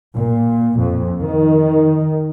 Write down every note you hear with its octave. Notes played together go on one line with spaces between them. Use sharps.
A#2
F2
D#3